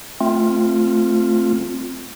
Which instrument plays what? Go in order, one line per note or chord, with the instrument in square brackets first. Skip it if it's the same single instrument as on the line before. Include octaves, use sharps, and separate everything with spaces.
[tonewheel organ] A3 C4 F4